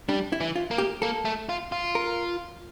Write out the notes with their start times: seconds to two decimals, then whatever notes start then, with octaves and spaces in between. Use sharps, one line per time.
0.09 G3 D4
0.32 E4
0.41 E3
0.56 F4
0.71 A#3
0.78 G4
1.02 A#3 A4
1.25 A3
1.49 F4
1.72 F4
1.95 A#4